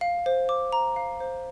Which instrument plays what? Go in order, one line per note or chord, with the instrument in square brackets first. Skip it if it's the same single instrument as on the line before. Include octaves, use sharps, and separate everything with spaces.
[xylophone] F5
C5
D6
A#5
F5
C5